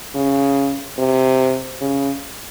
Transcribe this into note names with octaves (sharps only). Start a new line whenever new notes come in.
C#3
C3
C#3